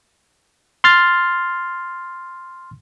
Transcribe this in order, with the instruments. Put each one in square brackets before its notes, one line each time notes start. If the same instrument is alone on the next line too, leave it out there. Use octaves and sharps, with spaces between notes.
[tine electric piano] C6 F6 A6